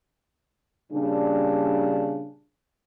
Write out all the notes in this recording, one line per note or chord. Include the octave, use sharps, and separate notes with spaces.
A#2 C#3 G3 D4